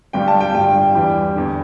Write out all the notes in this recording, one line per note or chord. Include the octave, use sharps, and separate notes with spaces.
G1 G2 G3 G5
A5
G5
G1 G2 G3 G5
E2 E3 G3
E2 D3